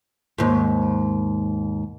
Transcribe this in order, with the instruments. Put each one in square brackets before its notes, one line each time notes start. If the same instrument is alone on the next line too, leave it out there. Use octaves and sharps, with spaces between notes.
[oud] D#2 G#2